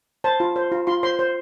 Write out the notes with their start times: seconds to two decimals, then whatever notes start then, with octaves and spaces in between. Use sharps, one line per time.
0.24 C5 A5
0.40 F4
0.56 C5
0.72 F4
0.87 F4 C6
1.03 C5 C6
1.19 C5